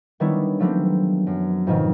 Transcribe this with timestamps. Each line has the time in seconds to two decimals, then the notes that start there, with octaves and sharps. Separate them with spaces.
0.20 D#3 G3 B3 D4 E4 C#5
0.59 F3 F#3 A3 B3 C4 G4
1.27 F#2
1.67 F2 G#2 B2 D#3 F#3